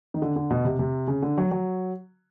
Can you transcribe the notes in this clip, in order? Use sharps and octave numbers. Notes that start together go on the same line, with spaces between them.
D#3
D3
D3
B2
C3
C3
C#3
D3
F#3
F#3